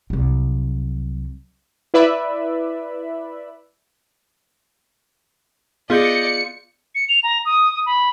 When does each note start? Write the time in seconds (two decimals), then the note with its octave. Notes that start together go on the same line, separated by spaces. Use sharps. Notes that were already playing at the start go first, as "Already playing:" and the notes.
0.10 C2 F#3
1.94 E4 B4 D5 E5 B5
5.90 B3 F4 G#4 D5 D#5 G6 C#7
6.95 C#7
7.09 F7
7.23 A#5
7.45 D#6
7.86 B5